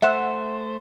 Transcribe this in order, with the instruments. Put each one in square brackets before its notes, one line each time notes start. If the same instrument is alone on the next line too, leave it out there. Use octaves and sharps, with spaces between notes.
[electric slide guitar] A3 C5 [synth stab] E5 F#5